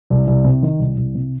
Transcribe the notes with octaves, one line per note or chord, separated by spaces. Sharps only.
C2
C2
C3
D#3
C2
C2
C3